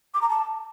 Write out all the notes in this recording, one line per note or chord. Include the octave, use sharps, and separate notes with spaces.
D6
A#5
A5